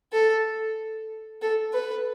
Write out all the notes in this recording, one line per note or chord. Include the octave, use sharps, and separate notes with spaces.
A4
A4
B4